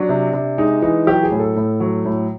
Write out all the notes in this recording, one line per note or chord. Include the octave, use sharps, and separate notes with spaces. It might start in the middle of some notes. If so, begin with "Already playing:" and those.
Already playing: F#3 D4
C3
C3
G#3 D#4
E3 D#4
F#3 G4
G#4
A2
A4
A2
F#3
A2